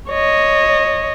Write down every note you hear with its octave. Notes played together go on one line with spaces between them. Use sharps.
C#5 D#5